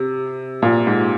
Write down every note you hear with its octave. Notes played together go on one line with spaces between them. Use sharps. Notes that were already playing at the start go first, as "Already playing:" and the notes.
Already playing: C3
A#2
G#2